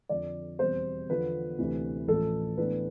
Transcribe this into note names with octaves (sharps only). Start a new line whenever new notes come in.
F2 D3 F3 D5
E2 B2 G3 C4 C5
E2 D3 F3 B3 F4 B4
D2 C3 E3
A1 A2 F3 A4
A2 E3 B3 D4 B4